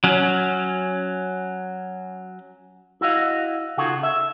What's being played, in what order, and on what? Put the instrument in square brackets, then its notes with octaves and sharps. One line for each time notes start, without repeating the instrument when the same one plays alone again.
[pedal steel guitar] F#3 C#4
[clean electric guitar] E4 F#4 D#5 F5
C#3 D#4 F4 F#4 G#4 A4
E5